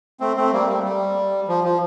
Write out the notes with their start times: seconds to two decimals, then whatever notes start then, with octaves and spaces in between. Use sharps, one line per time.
0.20 A3 C4
0.36 A3 C4
0.53 G3 A#3
0.69 G3
0.84 G3
1.48 F3
1.64 F3